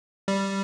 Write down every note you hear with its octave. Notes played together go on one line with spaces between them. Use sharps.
G3